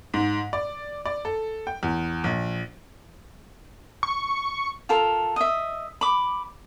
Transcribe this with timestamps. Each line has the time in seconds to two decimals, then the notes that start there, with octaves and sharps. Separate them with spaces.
0.14 G#2
0.53 D5
1.06 D5
1.25 A4
1.67 G5
1.83 E2
2.24 A#1
4.03 C#6
4.89 F4 A4 A#4
5.36 D#5 E5
6.01 B5 D6